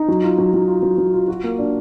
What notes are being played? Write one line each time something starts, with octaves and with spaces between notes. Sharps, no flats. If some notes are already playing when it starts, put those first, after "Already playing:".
Already playing: D#4
F#3
F4
F#3
F#3
F4
F#3
F#3
F4
F#4
A#3
D4